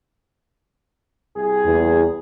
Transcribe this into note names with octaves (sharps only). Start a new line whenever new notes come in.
C2 G#4
E2